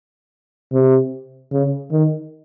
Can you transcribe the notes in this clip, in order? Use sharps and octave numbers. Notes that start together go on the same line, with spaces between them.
C3
C#3
D#3